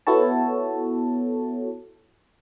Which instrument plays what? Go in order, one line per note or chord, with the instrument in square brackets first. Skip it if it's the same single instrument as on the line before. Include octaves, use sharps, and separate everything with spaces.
[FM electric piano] B3 E4 F#4 A4 C#5 A5